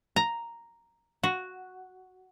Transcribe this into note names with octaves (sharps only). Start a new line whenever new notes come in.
A#5
F#4